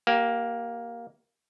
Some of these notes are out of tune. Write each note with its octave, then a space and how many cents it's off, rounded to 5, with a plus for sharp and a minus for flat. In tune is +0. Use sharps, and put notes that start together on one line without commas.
A#3 +5 G4 -20